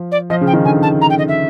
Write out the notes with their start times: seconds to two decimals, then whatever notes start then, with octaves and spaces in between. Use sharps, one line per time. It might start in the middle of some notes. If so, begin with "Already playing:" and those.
Already playing: F3
0.12 D5
0.30 F3 D#5
0.41 C#3
0.47 G5
0.53 D#3
0.65 D3 G#5
0.83 A5
1.01 A#5
1.10 G5
1.18 D#5
1.28 E5